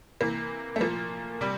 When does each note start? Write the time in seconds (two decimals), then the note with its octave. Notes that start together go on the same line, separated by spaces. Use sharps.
0.21 C3 E3 A#3
0.76 A3
0.80 A#2 F3 A#3
1.41 C3 G3